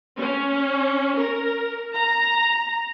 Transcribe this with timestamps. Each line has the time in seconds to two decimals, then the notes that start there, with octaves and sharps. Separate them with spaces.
0.18 C#4
1.17 A#4
1.94 A#5